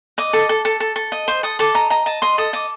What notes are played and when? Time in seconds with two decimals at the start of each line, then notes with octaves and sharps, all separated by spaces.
0.18 D#5 D6
0.33 A4
0.49 A4
0.65 A4
0.80 A4
0.96 A4
1.12 D#5
1.28 C5
1.43 A4 D#6
1.59 A4 D6
1.75 D#5 A#5
1.90 D#5 A#5
2.06 D#5 A5
2.22 D#5 C6
2.38 A4 D#6
2.53 D#5 D6